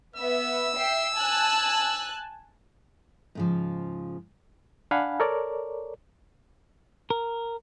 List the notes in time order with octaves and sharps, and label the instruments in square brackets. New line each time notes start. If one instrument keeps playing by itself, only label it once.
[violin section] B3 E5 [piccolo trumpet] E6
[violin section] E5 G5 C7
G#5 A5 F#6
[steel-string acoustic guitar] G#2 C#3 F3
[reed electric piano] D4 F5 F#5 G#5 B5
A4 A#4 C#5 D5
[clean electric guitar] A#4